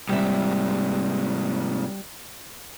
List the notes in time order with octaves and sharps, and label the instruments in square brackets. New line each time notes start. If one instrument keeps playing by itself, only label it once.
[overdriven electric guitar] G#2 C3 [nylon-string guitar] G3 E5